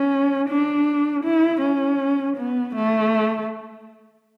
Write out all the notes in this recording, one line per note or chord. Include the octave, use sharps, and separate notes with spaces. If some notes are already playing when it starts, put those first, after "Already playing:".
Already playing: C#4
D4
E4
C#4
B3
A3